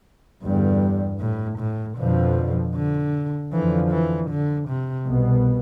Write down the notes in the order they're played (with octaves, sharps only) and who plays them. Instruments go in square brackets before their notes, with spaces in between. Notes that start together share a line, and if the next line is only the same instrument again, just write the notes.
[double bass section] E2 D3 G3 [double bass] G2
[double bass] A2
A2
[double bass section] F2 D3 F3 [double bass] B2
[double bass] D3
[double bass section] F2 D3 F3 [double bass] E3
[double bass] E3
D3
C3
[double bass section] C2 B2 B3